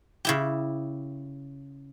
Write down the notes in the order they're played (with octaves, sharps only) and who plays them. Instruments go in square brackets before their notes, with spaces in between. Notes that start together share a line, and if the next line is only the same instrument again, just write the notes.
[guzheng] C#3 E4 G4